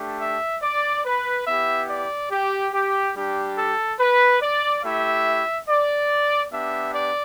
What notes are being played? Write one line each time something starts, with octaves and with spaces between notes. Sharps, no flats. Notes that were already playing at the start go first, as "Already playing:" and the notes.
Already playing: A3 D4 G4
E5
D5
B4
B3 E4 G4 E5
D5
G4
G4
G3 D4 G4
A4
B4
D5
A3 E4 G4 E5
D5
B3 D4 G4 E5
D5